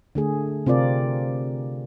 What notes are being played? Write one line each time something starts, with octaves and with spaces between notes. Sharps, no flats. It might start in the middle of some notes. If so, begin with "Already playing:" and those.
D3 A3 G#4
C3 C4 F4 A#4 D5